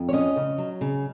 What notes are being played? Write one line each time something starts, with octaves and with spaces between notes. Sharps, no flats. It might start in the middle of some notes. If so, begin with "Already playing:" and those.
Already playing: F2
C#5
C#4 D#5
C#3
F#3
C#3